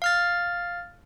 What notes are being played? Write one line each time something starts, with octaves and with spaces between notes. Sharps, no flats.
F5 F6 A6